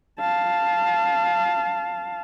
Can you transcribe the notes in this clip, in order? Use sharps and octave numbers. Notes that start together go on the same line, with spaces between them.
F5 A5